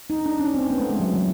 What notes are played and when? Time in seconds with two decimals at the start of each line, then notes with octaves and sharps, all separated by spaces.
0.10 D#4
0.26 D4
0.39 C#4
0.54 C4
0.70 B3
0.80 A3
0.90 G#3
1.00 F#3
1.14 E3